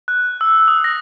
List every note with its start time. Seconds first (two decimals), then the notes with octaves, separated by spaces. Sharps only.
0.08 F#6
0.41 E6
0.68 D#6
0.84 A#6